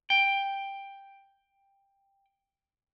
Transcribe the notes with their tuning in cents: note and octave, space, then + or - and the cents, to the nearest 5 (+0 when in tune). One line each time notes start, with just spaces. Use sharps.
G5 +10